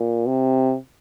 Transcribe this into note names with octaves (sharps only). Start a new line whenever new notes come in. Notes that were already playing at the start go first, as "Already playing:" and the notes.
Already playing: A#2
C3